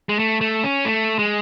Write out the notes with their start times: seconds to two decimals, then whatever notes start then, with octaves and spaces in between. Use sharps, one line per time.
0.09 G#3
0.19 A3
0.41 A3
0.64 C#4
0.85 A3
1.19 G#3